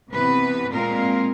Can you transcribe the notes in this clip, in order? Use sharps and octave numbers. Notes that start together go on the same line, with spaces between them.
C3 E3 B3 B4
A#2 G#3 C4 F4 A#4